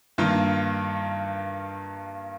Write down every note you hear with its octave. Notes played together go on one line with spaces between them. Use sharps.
G2 D#3 A#3 F4